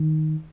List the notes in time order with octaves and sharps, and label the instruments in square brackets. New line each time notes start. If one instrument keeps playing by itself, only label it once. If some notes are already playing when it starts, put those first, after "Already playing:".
Already playing: [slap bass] D#3